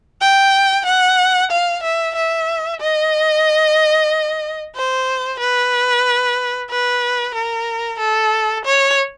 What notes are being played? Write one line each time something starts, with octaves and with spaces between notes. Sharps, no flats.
G5
F#5
F5
E5
E5
D#5
C5
B4
B4
A#4
A4
C#5